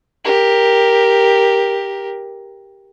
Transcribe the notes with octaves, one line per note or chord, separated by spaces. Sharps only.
G4 A#4